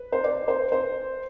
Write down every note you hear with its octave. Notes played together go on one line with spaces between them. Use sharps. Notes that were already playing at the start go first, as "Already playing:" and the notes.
Already playing: B4
C5
D5
C5
C5